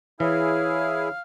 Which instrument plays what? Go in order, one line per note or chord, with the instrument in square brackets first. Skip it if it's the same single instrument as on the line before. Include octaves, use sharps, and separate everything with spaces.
[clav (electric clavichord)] E3 [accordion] E4 G#4 [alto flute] C#5 [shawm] F5